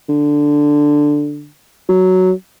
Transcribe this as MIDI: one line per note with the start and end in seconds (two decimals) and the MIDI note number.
0.09 1.50 50
1.89 2.31 54